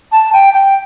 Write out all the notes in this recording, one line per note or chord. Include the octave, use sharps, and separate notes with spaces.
A5
G5
G5